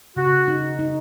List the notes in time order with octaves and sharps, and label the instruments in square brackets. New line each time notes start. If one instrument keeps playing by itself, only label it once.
[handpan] C#3 [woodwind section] F#4
[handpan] D#4
D#4